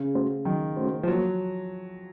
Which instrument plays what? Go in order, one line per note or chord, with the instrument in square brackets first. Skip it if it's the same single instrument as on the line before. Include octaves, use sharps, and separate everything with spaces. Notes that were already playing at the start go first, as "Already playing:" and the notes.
Already playing: [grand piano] C#3
[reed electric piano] A3 C#4 F#4 C5
[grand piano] D#3 [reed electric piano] F#3
[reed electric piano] A3 C#4 F#4 C5
[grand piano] F3
[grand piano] F#3 [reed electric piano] A#3